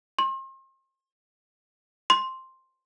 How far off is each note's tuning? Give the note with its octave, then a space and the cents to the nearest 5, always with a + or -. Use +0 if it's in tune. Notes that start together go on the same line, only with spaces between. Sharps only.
C6 +40
C6 +5